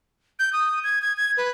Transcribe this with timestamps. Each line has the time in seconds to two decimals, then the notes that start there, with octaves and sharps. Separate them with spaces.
0.39 G6
0.53 D#6
0.84 G#6
1.02 G#6
1.17 G#6
1.37 B4